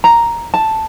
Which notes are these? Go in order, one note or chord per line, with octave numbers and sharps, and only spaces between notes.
A#5
A5